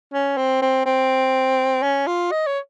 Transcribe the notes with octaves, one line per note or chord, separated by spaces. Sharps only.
C#4
C4
C4
C4
C#4
F4
D#5
C#5